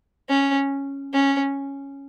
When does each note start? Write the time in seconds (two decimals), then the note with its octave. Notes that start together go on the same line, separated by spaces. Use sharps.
0.29 C#4
1.13 C#4